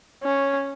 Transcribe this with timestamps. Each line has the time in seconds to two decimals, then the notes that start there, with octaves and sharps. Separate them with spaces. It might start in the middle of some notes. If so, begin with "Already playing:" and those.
0.24 C#4